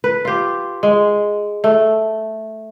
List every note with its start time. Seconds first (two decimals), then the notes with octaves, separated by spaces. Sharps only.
0.04 B4
0.25 F4 G4
0.83 G#3
1.64 A3